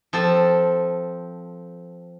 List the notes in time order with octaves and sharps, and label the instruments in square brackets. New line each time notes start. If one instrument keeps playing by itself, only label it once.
[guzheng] F3 C4 A4